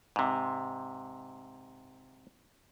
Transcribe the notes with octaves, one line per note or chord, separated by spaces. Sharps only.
G#2 C3